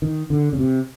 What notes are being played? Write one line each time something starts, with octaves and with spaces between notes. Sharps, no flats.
D#3
D3
C#3
C3